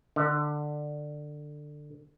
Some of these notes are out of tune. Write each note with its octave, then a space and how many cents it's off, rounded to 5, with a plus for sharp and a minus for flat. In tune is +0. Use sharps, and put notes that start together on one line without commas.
D3 +15